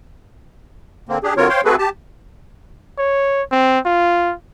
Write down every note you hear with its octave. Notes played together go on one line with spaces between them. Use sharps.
D3 A#3 C4
D4 G4 G#4
D3 F#3 C4 F4 A#4 C#5
C5 C#5 F5 G5 C6
A3 C4 F#4 G#4 A4 B4
G4 A5
C#5
C4
F4